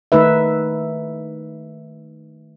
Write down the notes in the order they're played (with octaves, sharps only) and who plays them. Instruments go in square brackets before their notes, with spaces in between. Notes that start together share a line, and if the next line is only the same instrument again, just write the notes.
[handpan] D#3 A3 D#4 B4 E5